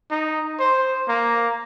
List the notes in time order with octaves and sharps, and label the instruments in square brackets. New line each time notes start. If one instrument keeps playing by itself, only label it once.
[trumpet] D#4
C5
A#3